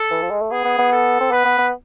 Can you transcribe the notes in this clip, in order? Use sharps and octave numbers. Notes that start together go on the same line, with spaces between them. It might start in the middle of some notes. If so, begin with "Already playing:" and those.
Already playing: A4
E3
F3
G#3
A3
B3 G#4
B3
B3
A4
C4
B3 B4
B3
B3